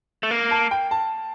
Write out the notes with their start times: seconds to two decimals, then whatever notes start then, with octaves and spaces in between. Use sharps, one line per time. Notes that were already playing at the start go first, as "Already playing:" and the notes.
0.23 A3
0.31 A#3
0.51 A5
0.71 G5
0.91 A5